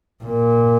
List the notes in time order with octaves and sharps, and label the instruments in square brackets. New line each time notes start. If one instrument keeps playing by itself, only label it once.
[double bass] A#2